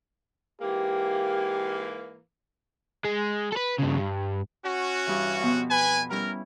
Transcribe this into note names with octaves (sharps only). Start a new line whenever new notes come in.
G#2 E3 A#3 G4
G#3
A4 B4
G2 C#3
G2
C#4 F#4
G2 E3
F2 B2 B3
B4 G#5 B5
G3 C#4 E4 A#4